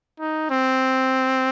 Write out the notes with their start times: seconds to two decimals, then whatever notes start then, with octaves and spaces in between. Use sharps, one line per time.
0.20 D#4
0.50 C4